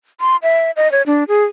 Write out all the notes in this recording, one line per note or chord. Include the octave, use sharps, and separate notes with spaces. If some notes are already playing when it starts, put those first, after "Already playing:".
C6
E5
D#5
C#5
D4
G#4